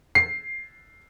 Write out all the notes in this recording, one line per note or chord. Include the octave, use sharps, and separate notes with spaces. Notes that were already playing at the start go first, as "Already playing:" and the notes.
C7